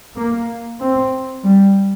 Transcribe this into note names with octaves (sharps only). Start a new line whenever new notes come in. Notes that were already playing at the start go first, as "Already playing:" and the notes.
A#3
C4
G3